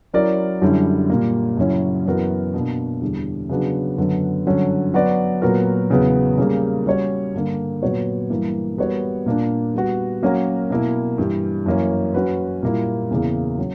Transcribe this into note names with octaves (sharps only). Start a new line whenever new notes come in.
F#3 C#4 E4 A#4 D5
F#2 D3 G3 C#4 E4
A#2 G3 A#3
F#2 C#3 F#3 C#4 E4
F#2 E3 B3 F#4 A#4
B2 A#3 D4
E2 D3 G3
C#3 F#3 B3 D4 F#4
F#2 D3 F#3 B3
G2 D3 F#3 C#4
F#3 B3 F#4 B4 D5
A#2 F#3 B3 F#4 A#4
E2 C#3 F#3 B3
C#3 G3 A#3
G3 C#4 F#4 C#5
G2 D3 A#3
A#2 F#3 B3 F#4 C#5
G2 E3 A#3
G3 B3 F#4 A#4 C#5
A#2 A#3 D4
G3 B3 F#4
F#3 A#3 C#4 F#4 A#4
B2 A#3 E4
G2 E3 G3
F#2 E3 A#3 C#4
F#3 C#4 F#4 B4
A#2 G3 A#3 E4
E2 C#3 E3 A#3
F#3 C#4